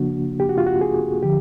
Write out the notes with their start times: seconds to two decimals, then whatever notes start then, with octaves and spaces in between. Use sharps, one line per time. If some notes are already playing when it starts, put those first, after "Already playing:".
Already playing: C#3 F3 A#3 D4 F#4
0.40 G4
0.49 F#4
0.58 F4
0.67 F#4
0.81 G#4
1.23 D3 F3 G4